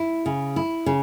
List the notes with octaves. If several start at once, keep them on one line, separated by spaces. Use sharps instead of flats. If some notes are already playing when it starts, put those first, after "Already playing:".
Already playing: E4
C#3
E4
C#3